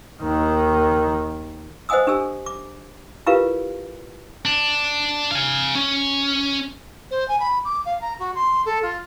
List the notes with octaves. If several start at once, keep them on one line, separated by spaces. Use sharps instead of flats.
D#2 D#3
C5 D#5 F#5 G#5 D#6 E6
D4 G4 A4 G#5 E6
D6
E4 F4 G4 A#4 B4 F5
D4
F5 G#5
C#4
C5
G#5
B5
D6
F5
A#5
F#4
C6
A4
F4